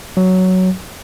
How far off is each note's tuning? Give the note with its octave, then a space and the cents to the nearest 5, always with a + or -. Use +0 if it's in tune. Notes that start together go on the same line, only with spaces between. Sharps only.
F#3 +5